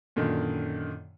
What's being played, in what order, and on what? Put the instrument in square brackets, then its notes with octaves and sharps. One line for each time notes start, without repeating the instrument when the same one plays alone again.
[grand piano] F#2 A#2 D3 D#3